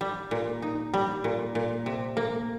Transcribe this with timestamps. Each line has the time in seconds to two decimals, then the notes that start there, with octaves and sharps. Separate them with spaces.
0.01 G3
0.31 A#2
0.62 D#4
0.94 G3
1.24 A#2
1.55 A#2
1.86 C3
2.17 A#3